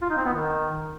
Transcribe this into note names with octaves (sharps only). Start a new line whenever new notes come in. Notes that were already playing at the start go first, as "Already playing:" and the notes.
F4
D#4
C4
B3
D#3